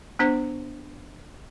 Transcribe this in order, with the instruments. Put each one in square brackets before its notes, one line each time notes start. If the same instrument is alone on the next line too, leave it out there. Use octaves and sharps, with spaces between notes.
[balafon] B3 D4 C5